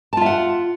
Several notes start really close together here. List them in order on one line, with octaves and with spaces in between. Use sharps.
A5 F4 E5 F#5